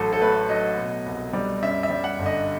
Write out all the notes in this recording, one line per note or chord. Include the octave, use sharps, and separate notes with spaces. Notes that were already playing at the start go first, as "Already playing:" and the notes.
Already playing: A1 F#3 A4
A4
A3 B4
F#3 D#5
B2
C2
G3
F#2 E5
E5
G3
F#5
G1
D#5